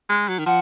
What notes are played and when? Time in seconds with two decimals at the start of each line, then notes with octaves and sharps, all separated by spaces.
0.09 G#3
0.29 F#3
0.39 D#3
0.46 F3 F#5